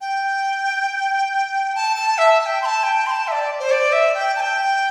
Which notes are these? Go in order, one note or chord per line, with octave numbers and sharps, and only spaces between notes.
G5
A5
A5
E5
A5
G5
C6
A5
G5
C6
A5
E5
D5
C5
D5
E5
G5
A5
G5